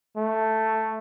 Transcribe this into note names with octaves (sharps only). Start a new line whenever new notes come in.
A3